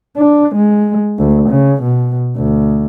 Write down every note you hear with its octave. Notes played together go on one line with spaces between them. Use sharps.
D4
G#3
D2
C#3
B2
D2